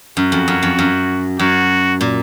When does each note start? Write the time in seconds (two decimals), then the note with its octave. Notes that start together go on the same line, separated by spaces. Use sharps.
0.17 F#2 F#4
0.32 F2
0.48 F#2
0.63 F2
0.79 F#2
1.39 F#2 F#4
2.01 A#2